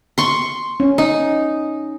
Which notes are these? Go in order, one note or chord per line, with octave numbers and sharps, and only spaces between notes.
C6 C#6
C#4
D#4